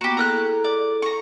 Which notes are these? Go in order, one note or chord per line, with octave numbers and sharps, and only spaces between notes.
A#3 B3 F#4 G4
E4 G#4 A4 A#5 E6 F#6
D5
A#5 C#6